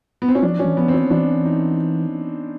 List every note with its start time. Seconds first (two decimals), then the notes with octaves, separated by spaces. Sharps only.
0.22 B3
0.28 C4
0.35 C#4
0.43 F3 D4
0.59 C#4
0.65 E3
0.77 F3 B3
0.88 E3 C4
0.94 C#4
1.10 E3 D4
1.45 D#4